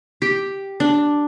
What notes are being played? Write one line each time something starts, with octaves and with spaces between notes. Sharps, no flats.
G4
D4